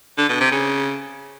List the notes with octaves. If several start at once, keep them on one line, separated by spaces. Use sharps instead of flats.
D3
B2
C3
C#3